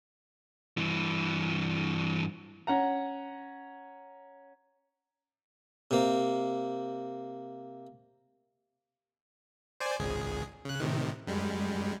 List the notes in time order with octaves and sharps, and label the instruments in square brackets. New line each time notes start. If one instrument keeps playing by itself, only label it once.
[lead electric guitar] G2 E3
[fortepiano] C#4 F#5 A#5
[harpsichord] C3 A#3
[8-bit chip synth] C5 D5 G#5
G#1 C#2 G#4
C#3 F#6
A2 C3 D#3
F#2 G3 G#3